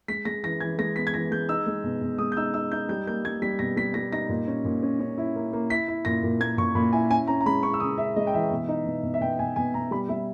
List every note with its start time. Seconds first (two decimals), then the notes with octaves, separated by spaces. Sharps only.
0.08 G#3 B6
0.25 G#3 A#6
0.43 E3 A#6
0.60 E3 G#6
0.78 G#3 A#6
0.96 B3 B6
1.07 G#6
1.14 E3 A#6
1.31 G#3 G6
1.49 D#4 E6
1.66 G#3
1.84 B2
2.01 B2
2.18 G#3 D#6
2.32 G6
2.37 D#4 E6
2.54 D#4 E6
2.72 D#4 G6
2.89 G3 G6
3.07 A#3 G6
3.24 G3 G#6
3.42 G3 B6
3.59 B2 A#6
3.77 G3 B6
3.94 G3 A#6
4.12 D#4 A#6
4.29 A#2
4.47 C#4
4.65 A#2
4.83 C#4
4.99 C#4
5.18 E4
5.36 A#3
5.53 A#3
5.70 E4 B6
5.88 E4
6.05 A#2 A#6
6.23 A#2
6.40 A#3 G#6
6.58 A#2 C#6
6.75 A#2 B5
6.93 E4 G#5
7.11 C#4 G#5
7.28 C#4 A#5
7.41 A#5
7.46 G#3 B5
7.63 C#4 C#6
7.74 E6
7.80 C#3 D#6
7.98 C#4 E5
8.16 G#3 D#5
8.27 G5
8.33 E3 E5
8.50 B2
8.69 D#4
8.86 B2
9.03 B2
9.14 E5
9.21 B2 G5
9.39 B2 G#5
9.56 B2 G#5
9.74 B2 A#5
9.91 G3 B5
10.09 G3 E5